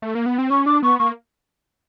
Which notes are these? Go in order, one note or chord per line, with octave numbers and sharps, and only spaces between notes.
A3
A#3
B3
C4
C#4 C#6
D4 D6
B3 C#6
A#3 C#6